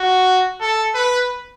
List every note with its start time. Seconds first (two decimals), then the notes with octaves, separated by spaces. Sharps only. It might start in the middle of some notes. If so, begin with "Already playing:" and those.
Already playing: F#4
0.61 A4
0.95 B4